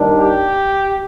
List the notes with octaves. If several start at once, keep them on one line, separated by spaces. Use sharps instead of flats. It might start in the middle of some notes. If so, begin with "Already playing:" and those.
Already playing: D#2 D#3 G3 D4
G4